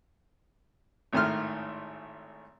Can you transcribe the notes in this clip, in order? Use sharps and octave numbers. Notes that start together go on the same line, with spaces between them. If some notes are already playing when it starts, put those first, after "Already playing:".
G#1 A2 D#3 A3 C6 F6